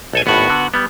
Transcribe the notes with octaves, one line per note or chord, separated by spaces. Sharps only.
B1 A4 G#5
G#1 A2 B3 F#4
D3
G3 B3